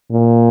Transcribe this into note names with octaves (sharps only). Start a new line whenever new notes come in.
A#2